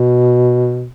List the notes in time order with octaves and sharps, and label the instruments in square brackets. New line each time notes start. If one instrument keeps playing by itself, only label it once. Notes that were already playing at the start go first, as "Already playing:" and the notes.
Already playing: [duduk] B2